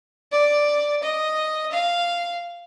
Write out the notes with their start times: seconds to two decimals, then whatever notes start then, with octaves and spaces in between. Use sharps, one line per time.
0.32 D5
1.02 D#5
1.71 F5